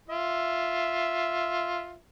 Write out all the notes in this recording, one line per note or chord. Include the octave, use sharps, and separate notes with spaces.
F4 E5